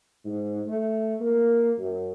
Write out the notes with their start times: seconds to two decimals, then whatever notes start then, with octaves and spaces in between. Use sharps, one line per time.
0.25 G#2
0.66 A3
1.21 A#3
1.78 F#2